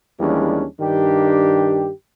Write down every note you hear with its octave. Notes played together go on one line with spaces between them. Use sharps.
D#2 E3 G3 G#3 C#4 D4
G2 D#3 D4 G4